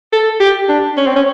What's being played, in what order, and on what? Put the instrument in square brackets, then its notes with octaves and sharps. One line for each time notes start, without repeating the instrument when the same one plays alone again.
[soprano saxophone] A4
G4
D4
C#4
C4
C#4